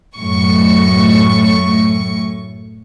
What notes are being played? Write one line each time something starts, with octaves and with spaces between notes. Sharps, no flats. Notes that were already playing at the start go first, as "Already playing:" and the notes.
F#2 A2 C#6